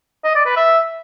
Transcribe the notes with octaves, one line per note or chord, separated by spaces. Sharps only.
D#5
D5
B4
E5